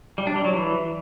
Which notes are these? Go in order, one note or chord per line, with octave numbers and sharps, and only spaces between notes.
G3
D4
G3
F#3
E3